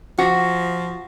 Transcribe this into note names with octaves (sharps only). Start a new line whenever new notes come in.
F3 F#4